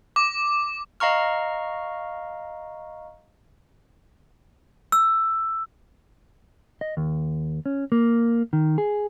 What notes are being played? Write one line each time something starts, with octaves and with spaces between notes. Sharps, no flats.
D6
D#5 F5 A#5 C#6 F6
E6
D#5
D#2
C#4
A#3
D#3
G#4